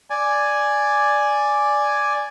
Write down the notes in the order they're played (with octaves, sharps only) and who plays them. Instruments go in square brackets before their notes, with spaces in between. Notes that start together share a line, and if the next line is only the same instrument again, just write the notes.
[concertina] D5 G#5